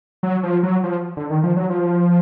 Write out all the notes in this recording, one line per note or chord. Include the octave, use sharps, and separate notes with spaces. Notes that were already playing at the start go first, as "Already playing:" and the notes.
F#3
F3
F#3
F3
D3
D#3
F3
F#3
F3